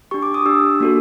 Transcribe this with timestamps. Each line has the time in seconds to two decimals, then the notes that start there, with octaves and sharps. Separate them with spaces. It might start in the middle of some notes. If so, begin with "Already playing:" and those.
0.11 D4 G4 C#6
0.22 D6
0.34 D#6
0.45 D4 G4 E6
0.80 A#3 D4 F#4 A4